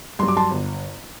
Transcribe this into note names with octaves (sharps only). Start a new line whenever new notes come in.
G2 F#3 C6
D6
A5 C6
G1